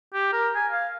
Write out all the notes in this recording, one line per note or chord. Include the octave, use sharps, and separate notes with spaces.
G4
A#4
G#5
F5